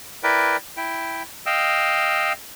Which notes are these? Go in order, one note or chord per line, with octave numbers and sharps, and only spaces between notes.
E4 A#4 B4 D5 G5
E4 G5
D#5 F5 G5 E6